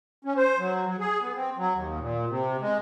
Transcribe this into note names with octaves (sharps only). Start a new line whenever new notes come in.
C#4
C5
F#3
F#3
G#4
B3
C4
F#3
D#2
A#2
C3
G#3